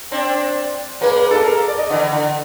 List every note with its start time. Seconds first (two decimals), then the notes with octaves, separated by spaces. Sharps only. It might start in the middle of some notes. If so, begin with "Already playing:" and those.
0.11 C4 D4
1.01 G#3 A#3 B4
1.16 B4
1.31 A4
1.45 A#4
1.68 D5
1.78 D#5
1.89 D3 E3
2.12 D3